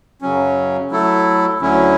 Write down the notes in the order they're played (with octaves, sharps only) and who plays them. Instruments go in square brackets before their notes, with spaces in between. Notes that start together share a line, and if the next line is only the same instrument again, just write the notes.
[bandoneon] F#2 C#3 F#3 C#4
F#3 A3 E4 A4
D2 D3 F#3 C#4 E4